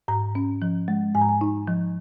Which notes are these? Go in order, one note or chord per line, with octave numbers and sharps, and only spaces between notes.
G#2 A#5
C#4
F3
G#3
G#2 G#5
A#5
G#5
D#4
F3